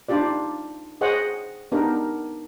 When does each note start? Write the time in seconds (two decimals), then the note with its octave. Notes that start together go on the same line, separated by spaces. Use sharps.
0.09 D4 D#4 F4 G4 D5
1.01 G#4 C5 C#5 D#5 F#5
1.72 B3 D4 D#4 G4 A#4